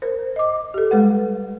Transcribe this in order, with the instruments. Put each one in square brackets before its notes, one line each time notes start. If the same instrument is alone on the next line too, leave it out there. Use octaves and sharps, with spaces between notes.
[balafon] A#4 C5
D#5 D6
G4 A4
G3 G#3 B4 F#5